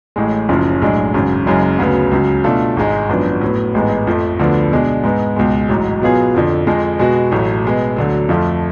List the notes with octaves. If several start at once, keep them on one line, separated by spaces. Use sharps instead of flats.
A1 A2 G#3
F#1 F#2 C#3 F3
B1 A2 G#3 D4
G#1 F#2 C#3
F#1 F#2 C#3 G#3
D2 C#3 F#3 B3
C#2 C#3 F#3
B2 A3 D4 F4 A4
G#1 G#2 G#3
G#1 F#2 F3 B3 D4
A2 F#3 B3
A1 G#2 G#3 B3
F2 F3 A3
D2 D3 F3 B3 D4
B2 G#3 D4
G#2 G#3 B3
C#2 B2 G#3
A1 G#2 F#3
B2 F#3 B3 F4 G#4
F2 D3 F3
F2 F3 G#3
B2 G#3 B3 F#4
A1 A2 F#3 A3
B2 G#3 B3
D2 D3 F#3
F2 F3 A3 F4 A4